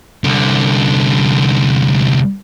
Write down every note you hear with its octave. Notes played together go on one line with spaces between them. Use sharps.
C2 D3